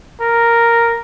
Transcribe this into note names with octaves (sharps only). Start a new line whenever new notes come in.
A#4